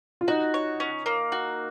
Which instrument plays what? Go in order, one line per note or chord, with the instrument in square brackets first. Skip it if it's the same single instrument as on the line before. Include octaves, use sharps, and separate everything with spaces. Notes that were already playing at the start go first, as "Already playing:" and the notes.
[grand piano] F4
[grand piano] D#4 [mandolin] F#4
[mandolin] C#5
C#4
A#3
F#4